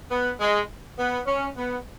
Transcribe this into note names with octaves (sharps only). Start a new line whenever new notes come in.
B3
G#3
B3
C#4
B3